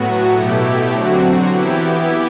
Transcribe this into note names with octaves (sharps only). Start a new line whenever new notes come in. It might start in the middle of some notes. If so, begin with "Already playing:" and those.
Already playing: A2 F#3 B3 F#4
B2 A3 E4 G4
D3 F#3 C4 F#4
E3 B3 E4 G4